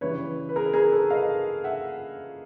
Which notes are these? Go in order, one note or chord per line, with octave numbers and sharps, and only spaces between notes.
C#3 E3 G3 B4 C#5
B4
G#4 A#4
G#4 A#4
A4 B4
D#5 F5
E5 F#5